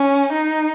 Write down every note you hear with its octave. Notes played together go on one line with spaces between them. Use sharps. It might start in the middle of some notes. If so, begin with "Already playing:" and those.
Already playing: C#4
D#4